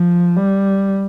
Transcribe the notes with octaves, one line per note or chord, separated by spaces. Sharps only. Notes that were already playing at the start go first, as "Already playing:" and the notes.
Already playing: F3
G3